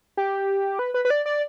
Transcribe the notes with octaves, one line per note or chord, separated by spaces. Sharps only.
G4
B4
B4
B4
D5
D5